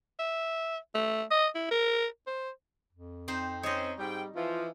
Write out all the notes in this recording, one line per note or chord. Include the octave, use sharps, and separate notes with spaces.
E5
A3
D#5
E4
A#4
C5
F2
C4 D#4 C5
C4 C#4 D#4 C5 C#5 D#5
G#2 G3 G5
E3 F3 F4